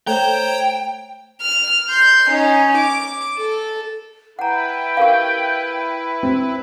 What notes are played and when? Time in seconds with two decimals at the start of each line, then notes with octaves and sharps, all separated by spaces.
0.07 A3 A4 C5 C#5 G5 A#5
1.42 F6
1.90 C6 G6
2.30 C#4 D#4
2.78 D6
3.37 A4
4.39 E4 B4 F#5 G5 A#5
4.97 G4 A#4 F5
6.23 C4